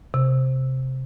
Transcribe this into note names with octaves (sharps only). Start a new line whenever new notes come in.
C3